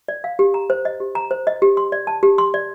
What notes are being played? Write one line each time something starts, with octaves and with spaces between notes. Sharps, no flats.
D5
F5
G4
A#5
C5
D#5
G4
A#5
C5
D#5
G4
C6
D5
A5
G4
C6
D5